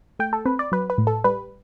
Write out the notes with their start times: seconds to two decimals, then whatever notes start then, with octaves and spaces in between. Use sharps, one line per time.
0.19 A3 G5
0.33 A4
0.45 C4 B4
0.59 D5
0.72 F#3 B4
0.90 B4
0.98 A2
1.07 A4
1.24 G3 B4